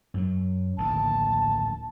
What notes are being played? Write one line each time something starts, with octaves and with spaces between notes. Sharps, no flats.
F#2 F#3
D1 A#1 D#3 A5